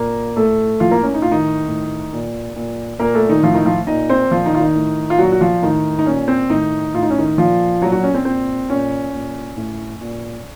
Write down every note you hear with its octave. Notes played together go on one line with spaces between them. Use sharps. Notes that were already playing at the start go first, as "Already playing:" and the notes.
Already playing: A#2 A#3 A#4
A2 A3 A4
A2 F3 F4
A#3 A#4
C#4
D#4
A2 F4
D#3 D#4
A2
A#2
A#2
A#2 A#3 A#4
A3 A4
D#3 D#4
A2 F3 F4
D#3 D#4
F3 F4
A#2 D#4 D#5
C4 C5
A#2 F3 F4
D#3 D#4
F4
D#3 D#4
A2
F4
A#2 F#3 F#4
F#4
F3 F4
A2 D#3 D#4
D#4
A#2 C#4
C4
A2 D#3 D#4
A2 F4
D#4
C#4
D#3 D#4
A#2 F3 F4
A#2 F#3 F#4
F#3 F#4
C#4
C4
A#2 C4
A#2 C#4
A#2
A2
A#2